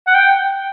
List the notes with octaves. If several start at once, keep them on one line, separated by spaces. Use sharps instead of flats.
F#5
G5